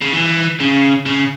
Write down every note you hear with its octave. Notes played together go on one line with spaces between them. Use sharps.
C#3
E3
C#3
C#3